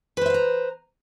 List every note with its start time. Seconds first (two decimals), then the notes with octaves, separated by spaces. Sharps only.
0.17 B4
0.21 C5
0.26 E5
0.30 F5
0.34 A#5